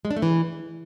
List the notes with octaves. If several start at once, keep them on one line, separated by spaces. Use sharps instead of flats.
G#3
D4
A3
E3